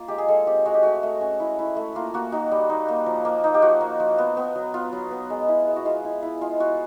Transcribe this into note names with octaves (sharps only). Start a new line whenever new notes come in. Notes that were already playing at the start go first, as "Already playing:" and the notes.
Already playing: A#3 F4
G#3 G4
G#4
G#3 A4
C4 G4
G#3 F#4
G4
A3 F#4
A3
C#4
E4
E4
A3
A#3 F4
A#3 F#4
D#4 F#4
G3
D#4
A#3
F3
A#3
D#4
G4
F3 F#4
A#3
F3
B3
B3
F#3
B3 F4
F#3
B3
G#3
E4
G#3
F#4
G#3 F4
E4
E4
G#3 F4
F4 F#4